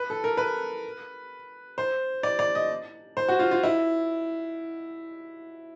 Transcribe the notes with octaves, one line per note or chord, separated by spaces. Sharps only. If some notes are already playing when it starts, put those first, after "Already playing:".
Already playing: B4
A4
A#4
B4
C5
D5
D5
D#5
C5
F#4
F4
F4
E4